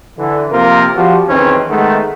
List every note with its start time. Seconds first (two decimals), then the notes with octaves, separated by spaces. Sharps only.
0.18 D3 E3
0.52 C3 F3 A#3 C4 F4 A#4
0.96 F3 G3 F#4
1.28 B1 E2 D#3 C4 C#4 B4
1.68 D#3 G#3 A3 B3